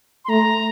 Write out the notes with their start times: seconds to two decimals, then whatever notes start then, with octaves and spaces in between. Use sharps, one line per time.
0.25 C6
0.29 A3 A#5